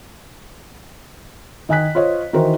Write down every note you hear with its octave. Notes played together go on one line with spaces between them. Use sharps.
D#3 D#5 G#5 F#6 B6
F4 C5 C#5 D#5
D#3 E3 D#4 F#4 A#4 C5